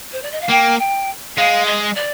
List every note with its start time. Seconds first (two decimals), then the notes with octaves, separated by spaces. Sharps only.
0.12 C5
0.23 D5
0.32 D#5
0.41 F5
0.50 A#3 G5
0.79 G5
1.37 G#3 F5
1.66 D#5
1.95 D5